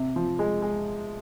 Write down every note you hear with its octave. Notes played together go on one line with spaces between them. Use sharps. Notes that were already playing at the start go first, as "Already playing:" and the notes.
Already playing: C3
F3
G#3
G#3